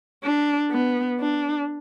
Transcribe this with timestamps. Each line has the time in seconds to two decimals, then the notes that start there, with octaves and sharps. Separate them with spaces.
0.24 D4
0.72 B3
1.20 D4